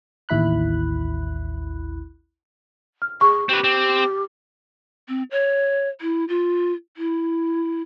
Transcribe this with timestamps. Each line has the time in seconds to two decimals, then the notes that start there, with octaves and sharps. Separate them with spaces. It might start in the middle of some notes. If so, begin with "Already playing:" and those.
0.29 A1 D#2 E4 B5 F#6
3.02 F6
3.21 G#4 C#6
3.49 C4 G4 B4
3.64 C4
5.08 C4
5.31 C#5
6.01 E4
6.29 F4
6.97 E4